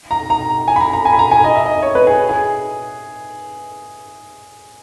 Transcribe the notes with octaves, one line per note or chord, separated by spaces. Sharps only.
A#5
A#5
G#5
B5
A#5
A#5
G#5
B5
A#5
G#5
D#5
E5
D#5
C#5
B4
G#4
G#4